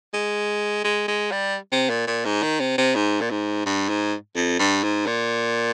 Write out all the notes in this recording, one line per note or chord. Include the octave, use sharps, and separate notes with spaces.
G#3
G#3
G#3
G3
C3
A#2
A#2
G#2
D#3
C3
C3
G#2
A#2
G#2
G2
G#2
F2
G2
G#2
A#2